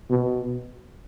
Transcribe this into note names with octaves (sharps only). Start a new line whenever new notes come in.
B2